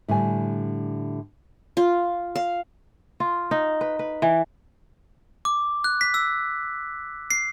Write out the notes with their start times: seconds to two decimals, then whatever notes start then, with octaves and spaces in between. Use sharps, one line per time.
0.08 A2 D3 G3 G#5
1.77 F4
2.35 F5
3.20 F4
3.51 D#4
3.81 B4
3.99 B4
4.22 E3
5.45 D6
5.84 F#6
6.01 B6
6.14 E6
7.31 C7